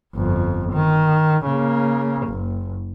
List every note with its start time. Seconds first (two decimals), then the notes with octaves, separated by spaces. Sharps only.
0.15 G1 F2
0.73 D#3
1.46 C#3 A#3
2.27 F#1